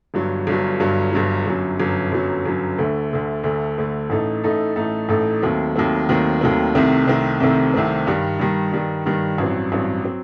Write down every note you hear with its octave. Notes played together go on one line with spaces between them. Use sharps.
G1 G2 F#3
G1 G2 F#3
G1 G2 F#3
G1 G2 F#3
G1 F#2 F#3
G1 F#2 F#3
G1 F#2 F#3
G1 F#2 F#3
D2 D3 A3
D2 D3 A3
D2 D3 A3
D2 D3 A3
A1 A2 A3 D#4 A4
A1 A2 A3 D#4 A4
A1 A2 A3 D#4 A4
A1 A2 A3 D#4 A4
D#2 D#3 F#3 A3 C4
D#2 D#3 F#3 A3 C4
D#2 D#3 F#3 A3 C4
D#2 D#3 F#3 A3 C4
C2 C3 D#3 A3 C4
C2 C3 D#3 A3 C4
C2 C3 D#3 A3 C4
C2 C3 D#3 A3 C4
G2 D#3 G3
G2 D#3 G3
G2 D#3 G3
G2 D#3 G3
A1 G2 F#3 C4
A1 G2 F#3 C4
F#3 C4